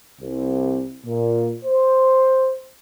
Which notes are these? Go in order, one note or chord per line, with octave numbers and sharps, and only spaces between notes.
C2
A#2
C5